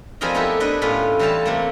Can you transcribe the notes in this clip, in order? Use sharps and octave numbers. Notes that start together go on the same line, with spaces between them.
F3 G3 C4 G#4 A#4 D#5
B3 D#4 E4 G4 A4 A#4
A3 D4 E4 B4 D#5
A2 C#4 F4 B4
E3 G3 A4 C5 F5 A5
C3 A3 A#3